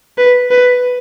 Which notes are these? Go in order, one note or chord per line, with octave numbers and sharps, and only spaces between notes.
B4
B4